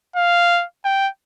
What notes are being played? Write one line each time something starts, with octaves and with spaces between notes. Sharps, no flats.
F5
G5